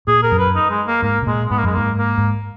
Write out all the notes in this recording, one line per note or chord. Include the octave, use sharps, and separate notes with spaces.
A#2 G#4
A#4
F#2
B4
D#4
G#3
A#3
G#2 A#3
B2
A#2 G#3
G#2 B3
A#3
F#2 G#3
G#2 A#3
A#3
G#2